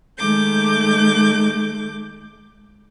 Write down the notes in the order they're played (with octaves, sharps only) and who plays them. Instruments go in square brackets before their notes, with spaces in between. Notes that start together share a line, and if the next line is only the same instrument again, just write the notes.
[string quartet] D#3 G#3 A3 D6 G6